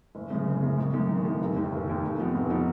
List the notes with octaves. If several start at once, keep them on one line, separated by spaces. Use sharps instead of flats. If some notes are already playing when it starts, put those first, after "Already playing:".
F#1
F#2 C#3
F#1
F#2 C#3
G#1
F#2 D#3
G#1
F#2 D#3
F1
D#2 D#3
F1
D#2 D#3
F1
F2 F3 B3 D#4
F1
F3 B3 D#4